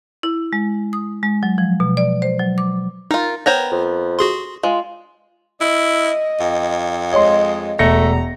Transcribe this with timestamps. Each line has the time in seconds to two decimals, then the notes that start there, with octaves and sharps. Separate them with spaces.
0.23 E4
0.53 G#3
0.93 D#6
1.23 G#3
1.43 F#3
1.58 F3
1.80 B2
1.97 D5
2.22 C5
2.39 F#3
2.58 D6
3.11 D#4 F4 A#4
3.46 B3 A#4 C5 C#5 G5 A#6
3.72 F2
4.19 F#4 G#4 C6
4.63 G#3 F4
5.61 E4 D#5
6.40 F2
7.12 G#3 C#5 D#5 C6
7.79 E1 A3 A#5 A#6 C#7